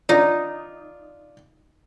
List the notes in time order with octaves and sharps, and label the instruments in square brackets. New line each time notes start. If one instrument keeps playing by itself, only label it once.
[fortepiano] D4 F4 [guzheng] D#4